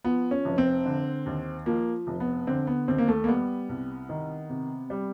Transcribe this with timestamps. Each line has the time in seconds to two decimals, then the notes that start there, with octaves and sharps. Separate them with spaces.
0.04 F3 B3
0.31 C#4
0.45 F1
0.58 C4
0.85 D3
1.26 D#2
1.66 F3 A#3
2.07 F1
2.20 B3
2.47 D3 C4
2.67 B3
2.88 D#2 C4
2.98 A#3
3.08 A3
3.24 A#3
3.28 G3 B3
3.69 C2
4.09 D#3
4.49 C3
4.90 G3